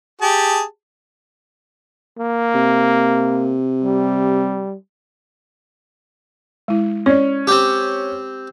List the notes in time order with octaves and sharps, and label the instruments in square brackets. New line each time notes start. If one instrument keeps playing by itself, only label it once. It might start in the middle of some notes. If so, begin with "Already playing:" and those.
[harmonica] G4 G#4 A5
[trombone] A#3
[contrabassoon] C3
[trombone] G3
[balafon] G#3 E4
[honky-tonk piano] C#4 [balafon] C#5 D5
[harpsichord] C4 G4